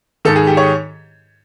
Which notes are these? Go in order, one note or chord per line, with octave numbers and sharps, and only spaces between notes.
G#2 D#3 A4
G#4
G4
C#5